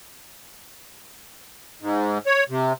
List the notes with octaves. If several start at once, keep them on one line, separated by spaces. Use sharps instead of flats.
G#2
C#5
C3